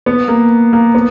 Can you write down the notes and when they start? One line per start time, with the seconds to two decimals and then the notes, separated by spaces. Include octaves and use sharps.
0.06 B3
0.28 A#3
0.73 A#3
0.95 B3